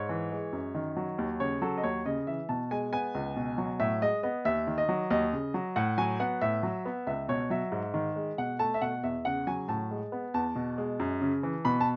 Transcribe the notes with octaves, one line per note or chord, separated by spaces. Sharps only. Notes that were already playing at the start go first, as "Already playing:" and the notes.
Already playing: G#2 C#5
E3
G#3
F#2
D#3
F#3
D#2
C#3 C#5
F#3 A4
D#5
D#2 C#5
C#3 D#5
E3 E5
B2 A5
G#3 G#5
B3 G#5
C#2
B2
F#3
A2 E5
G#3 D#5
B3 D#5
D#2 E5
D#3
D#5
F#3
D#2 D#5
C#3
F#3
A2 F#5
F#3 G#5
B3 F#5
A2 E5
F#3
B3
C#2 E5
B2 C#5
F#3 E5
G#2
D#3
G#3
B2 F#5
A3 A5
E5
B2 F#5
E2 E5
C#3 F#5
F#3 G#5
A2 A5
G#3
B3
E2 A5
B2
G#3
F#2
C#3
E3
B2 B5
A5